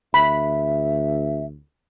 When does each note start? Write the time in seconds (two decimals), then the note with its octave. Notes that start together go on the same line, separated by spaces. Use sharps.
0.14 D2 E5 B5